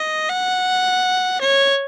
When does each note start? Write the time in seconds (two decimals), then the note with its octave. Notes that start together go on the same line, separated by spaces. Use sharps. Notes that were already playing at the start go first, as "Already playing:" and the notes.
Already playing: D#5
0.30 F#5
1.41 C#5